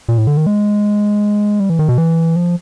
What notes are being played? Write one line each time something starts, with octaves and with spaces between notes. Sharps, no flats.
A#2
A2
D3
D#3
G#3
G3
E3
D#3
B2
E3
F3